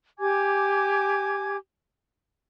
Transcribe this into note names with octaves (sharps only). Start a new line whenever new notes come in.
G4 G#5 D6 G#6